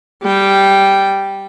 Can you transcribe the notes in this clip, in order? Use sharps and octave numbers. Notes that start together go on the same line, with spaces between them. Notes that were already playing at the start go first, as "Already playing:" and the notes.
G3 G5